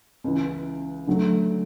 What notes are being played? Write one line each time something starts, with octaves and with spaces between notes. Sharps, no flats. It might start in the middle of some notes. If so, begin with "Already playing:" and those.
C#2 C#3 E3
D3 F#3 A3